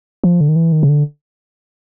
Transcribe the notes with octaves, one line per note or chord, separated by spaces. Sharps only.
F3
D3
D#3
E3
D#3
C#3
D3